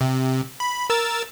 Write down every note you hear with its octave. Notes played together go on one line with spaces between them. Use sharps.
C3
B5
A#4 E6 A6